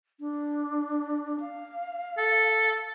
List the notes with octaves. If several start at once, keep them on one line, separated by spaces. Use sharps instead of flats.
D4
F5
A4